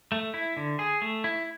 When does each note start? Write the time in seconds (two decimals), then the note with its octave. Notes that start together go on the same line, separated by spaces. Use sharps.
0.12 A3
0.34 E4
0.57 D3
0.79 G#4
1.02 A3
1.24 E4